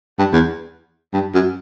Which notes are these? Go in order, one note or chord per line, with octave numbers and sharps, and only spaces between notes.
G2
E2
G2
F#2